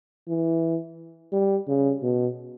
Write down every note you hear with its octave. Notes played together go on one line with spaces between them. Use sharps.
E3
G3
C#3
B2